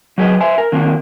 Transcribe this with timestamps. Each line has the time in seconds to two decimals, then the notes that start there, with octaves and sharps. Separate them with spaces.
0.18 F#3 A3 G#4 B4 D#5
0.40 C5 E5 G#5
0.58 A#4
0.72 D3 D#3 A#3 C4